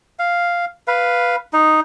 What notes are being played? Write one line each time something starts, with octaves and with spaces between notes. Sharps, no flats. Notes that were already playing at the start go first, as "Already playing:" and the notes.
F5
B4 F5
D#4